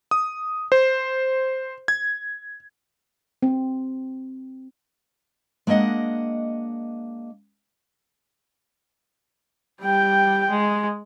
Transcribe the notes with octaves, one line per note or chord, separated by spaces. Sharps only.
D#6
C5
G#6
C4
G#3 A#3 D4 D#5 F#5
G3 G5
G#3